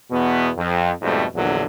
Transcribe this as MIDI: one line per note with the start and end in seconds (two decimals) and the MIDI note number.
0.11 0.50 40
0.11 0.50 47
0.11 0.50 59
0.57 0.91 41
1.02 1.24 41
1.02 1.24 44
1.02 1.24 47
1.02 1.24 55
1.02 1.24 57
1.35 1.65 34
1.35 1.65 40
1.35 1.65 46
1.35 1.65 50
1.35 1.65 54